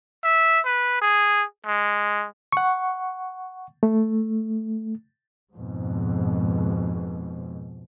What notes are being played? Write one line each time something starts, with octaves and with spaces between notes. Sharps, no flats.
E5
B4
G#4
G#3
F#5 C#6
A3
F2 G#2 B2